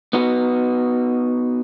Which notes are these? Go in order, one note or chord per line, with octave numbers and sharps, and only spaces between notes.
B3 D#4 F#4